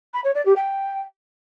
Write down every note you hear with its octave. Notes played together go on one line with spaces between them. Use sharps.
B5
C#5
D5
G4
G5